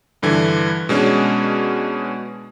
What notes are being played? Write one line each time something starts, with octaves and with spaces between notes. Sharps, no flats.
G2 D3 E3
B2 G#3 C#4 D4